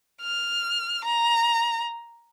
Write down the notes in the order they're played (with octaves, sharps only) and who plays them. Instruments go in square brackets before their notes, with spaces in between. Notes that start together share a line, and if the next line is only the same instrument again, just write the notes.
[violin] F6
A#5